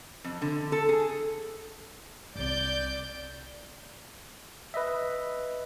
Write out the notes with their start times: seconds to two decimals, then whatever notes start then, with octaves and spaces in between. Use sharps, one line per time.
0.24 F2
0.42 D3
0.72 A4
0.89 G#4
2.36 C2 C4 D5 G6
4.74 B4 D#5 E5